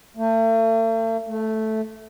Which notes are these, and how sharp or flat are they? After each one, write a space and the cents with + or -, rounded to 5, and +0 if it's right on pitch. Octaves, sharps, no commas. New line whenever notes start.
A3 +40
A3 -5